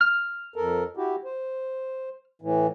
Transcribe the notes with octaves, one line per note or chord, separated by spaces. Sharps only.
F6
F2 A4 A#4
E4 F#4 G4
C5
A2 E3